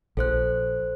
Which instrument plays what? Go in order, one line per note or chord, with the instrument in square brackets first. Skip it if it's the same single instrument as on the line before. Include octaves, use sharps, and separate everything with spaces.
[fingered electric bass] A#1 [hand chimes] A4 C5 F#6